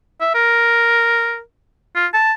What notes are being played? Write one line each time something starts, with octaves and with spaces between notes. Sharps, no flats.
E5
A#4
F4
A5